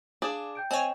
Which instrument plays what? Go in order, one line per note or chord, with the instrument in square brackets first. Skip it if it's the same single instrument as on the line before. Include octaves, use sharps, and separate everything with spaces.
[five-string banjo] D4 G#4 D5 [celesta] F5 E7
[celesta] G5 G6 D7
[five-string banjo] C4 [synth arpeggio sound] C#5 G#5 [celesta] D#5 G5 C#6